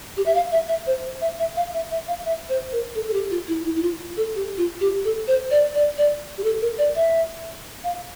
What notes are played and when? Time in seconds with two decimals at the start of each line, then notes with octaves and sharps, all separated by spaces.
0.17 G4
0.26 E5
0.34 F5
0.52 E5
0.68 E5
0.87 C5
1.21 E5
1.39 E5
1.56 F5
1.74 E5
1.91 E5
2.08 F5
2.25 E5
2.49 C5
2.72 A#4
2.95 A4
3.08 A4
3.13 G4
3.30 F4
3.48 E4
3.65 E4
3.76 E4
3.82 F4
4.17 A4
4.35 G4
4.57 F4
4.81 G4
5.04 A4
5.27 C5
5.51 D5
5.75 D5
5.98 D5
6.38 G4
6.44 A4
6.61 A#4
6.78 D5
6.95 E5
7.84 F5